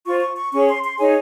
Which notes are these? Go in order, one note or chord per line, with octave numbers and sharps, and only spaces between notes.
F4 C5 C#6
C#6
C#6
C#4 G#4 C#5 C#6
C6
C6
D#4 G#4 C#5 G#5